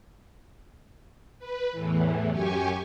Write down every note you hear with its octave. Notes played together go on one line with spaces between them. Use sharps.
B4
E2 A2 E3
F#2 G4 G#5 C#6